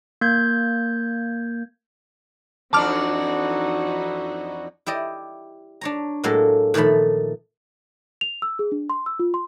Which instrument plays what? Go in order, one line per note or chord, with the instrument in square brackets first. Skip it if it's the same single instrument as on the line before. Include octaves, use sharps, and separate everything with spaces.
[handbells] A#3 G6 G#6
[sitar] F2 D4 [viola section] E3 D#4 F#4 [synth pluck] A5 D6 F6
[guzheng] E4 G4 D5 D#5
D4 C#5 A#5
A2 F#3 G#3 A#3 A4
A#2 D#3 F3 A3 B5
[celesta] F7
E6
G#4
D4
C6
E6
F4
C6